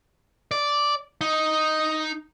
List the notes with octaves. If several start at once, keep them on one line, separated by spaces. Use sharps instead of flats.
D5
D#4